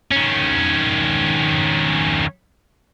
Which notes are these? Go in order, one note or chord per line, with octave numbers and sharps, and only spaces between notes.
D#3 C#4